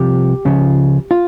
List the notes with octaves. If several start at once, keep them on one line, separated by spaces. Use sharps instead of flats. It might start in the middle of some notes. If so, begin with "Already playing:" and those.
Already playing: C2 C3 F3 G4
C#2 C#3 F3
F4